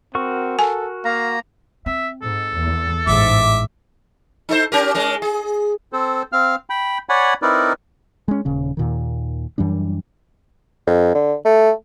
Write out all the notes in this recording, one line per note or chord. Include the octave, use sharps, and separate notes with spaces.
C4 F#4 A#4 C#6
A4 G#5
A#3 F5 A#5
C4 E5
G#2 A4
E2
A1 G#2 E3 E5 D6
D#4 A4 C5
C#4 G4 A#4
G#3 C#4 A#4
G#4
C4 A4 C5
C4 F5 F6
G5 B5
C#5 D5 F#5 G#5 B5
C4 D#4 E4 A#4 B4 D5
G#3 C#4
D#1 C#3 C#4
D#2 A#2 D#3
F#2 E3 G3 D4
F2
D3
A3